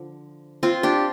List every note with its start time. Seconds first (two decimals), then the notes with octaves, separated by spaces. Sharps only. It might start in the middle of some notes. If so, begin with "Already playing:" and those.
Already playing: D3 F3
0.63 C4 F4
0.83 D4 G4